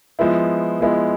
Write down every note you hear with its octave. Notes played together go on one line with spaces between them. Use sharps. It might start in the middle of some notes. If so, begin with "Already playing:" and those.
F3 G#3 B3 E4
F3 G#3 B3 E4